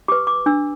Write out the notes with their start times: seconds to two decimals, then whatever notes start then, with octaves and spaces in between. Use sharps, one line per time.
0.08 G4 B4 D6
0.27 D6
0.46 D4 E6